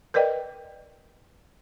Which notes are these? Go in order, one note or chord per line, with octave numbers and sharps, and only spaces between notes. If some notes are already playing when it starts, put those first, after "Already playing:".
A#4 B4 D5 D#5 G5